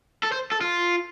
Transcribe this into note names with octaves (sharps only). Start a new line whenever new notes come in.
A4
C5
A4
F4